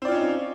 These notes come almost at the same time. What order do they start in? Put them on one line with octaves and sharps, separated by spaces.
C4 D5 F4 C#4 D#4